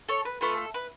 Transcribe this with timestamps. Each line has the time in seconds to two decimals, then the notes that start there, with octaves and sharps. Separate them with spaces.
0.08 A4 C#5
0.25 B4
0.41 A3 F4 A4 B4
0.57 A4
0.74 B4